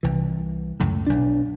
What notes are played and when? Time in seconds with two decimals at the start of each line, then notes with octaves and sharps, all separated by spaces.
0.03 C2 E3
0.80 C#2 F#2 A2
1.07 B1 D4